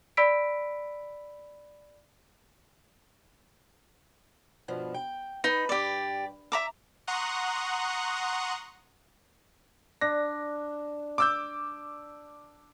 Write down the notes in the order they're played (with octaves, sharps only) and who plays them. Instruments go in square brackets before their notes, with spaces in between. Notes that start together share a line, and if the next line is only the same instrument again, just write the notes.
[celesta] D5 B5 E6 B6 D7
[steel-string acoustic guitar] G2 B2 F3
G5
[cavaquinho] D#4 [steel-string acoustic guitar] B4
[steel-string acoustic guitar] G2 [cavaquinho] G4 D5
[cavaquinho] E5 A#5 D6
[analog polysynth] F#5 A#5 C6 C#6 D#6 F#6
[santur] D4 [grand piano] A#6
[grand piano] D6 E6 G6